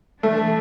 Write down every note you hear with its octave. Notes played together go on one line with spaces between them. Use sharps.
E3 G3 A3 D4